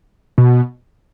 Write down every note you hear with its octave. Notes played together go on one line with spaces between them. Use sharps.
B2